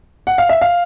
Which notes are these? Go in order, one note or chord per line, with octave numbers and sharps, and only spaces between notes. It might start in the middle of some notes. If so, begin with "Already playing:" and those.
F#5
F5
E5
F5